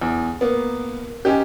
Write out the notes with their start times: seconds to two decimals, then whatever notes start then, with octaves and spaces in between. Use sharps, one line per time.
0.02 E2
0.41 A#3 B3
1.25 C#4 D#4 G4